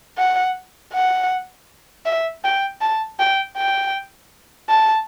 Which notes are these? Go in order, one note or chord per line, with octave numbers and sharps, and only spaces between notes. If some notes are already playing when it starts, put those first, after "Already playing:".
F#5
F#5
E5
G5
A5
G5
G5
A5